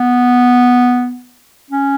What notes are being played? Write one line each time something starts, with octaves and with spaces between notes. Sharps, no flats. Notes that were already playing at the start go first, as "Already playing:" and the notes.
Already playing: B3
C#4